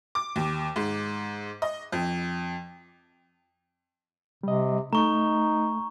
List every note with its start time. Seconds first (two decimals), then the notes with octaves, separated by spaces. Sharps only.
0.15 D6
0.36 D#2
0.76 G#2
1.62 D#5
1.92 F2
4.43 C3 G3 D#5
4.93 A3 D#4 A#5 C#6